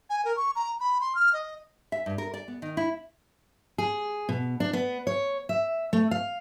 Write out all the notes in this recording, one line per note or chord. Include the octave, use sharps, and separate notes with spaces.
G#5
A#4
C#6
A#5
B5
C6
F6
D#5
E5
G2
A#4
D5
B3
D#3
E4
G#4
B2
D4
B3
C#5
E5
A3
F5